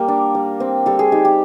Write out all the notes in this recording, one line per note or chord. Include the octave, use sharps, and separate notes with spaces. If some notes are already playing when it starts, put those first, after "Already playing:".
Already playing: G3 A#3 A#4
D4
G3
C4
G3 A4
G#4
D#4 G4
G4